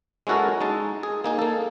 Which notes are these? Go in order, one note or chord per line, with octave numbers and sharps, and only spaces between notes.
G#3 C#4 E4 F#4 A4 A#4
G#3 D#4 A5
G#4
A#3 D#4 G#4
A#3 A4